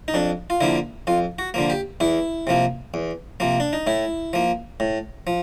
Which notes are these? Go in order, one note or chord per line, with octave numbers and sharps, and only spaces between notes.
D#4
F2 D4
F4
D3 F3 A#3 E4
F2 F4
F#4
D3 F3 A#3
G4
E2 E4
C3 F3 A#3
E2
C3 F3 A#3
D4
D#4
A2 E4
F3 A#3
A2
F3